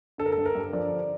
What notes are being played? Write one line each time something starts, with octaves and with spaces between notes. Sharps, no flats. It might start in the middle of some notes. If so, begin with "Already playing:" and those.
D3 A4
A#4
A4
G2
A#4
G2
F3 D5
D3